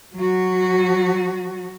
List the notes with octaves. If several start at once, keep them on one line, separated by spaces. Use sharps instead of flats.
F#3 F#4